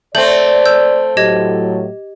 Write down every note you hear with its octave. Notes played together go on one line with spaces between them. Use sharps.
A3 C4 D5 G6 F#7
E6 G6
A2 F#3 G4 D#5 G#6